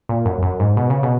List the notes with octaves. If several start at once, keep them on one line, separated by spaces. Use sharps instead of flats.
A#2
F#2
F#2
G#2
B2
C#3
B2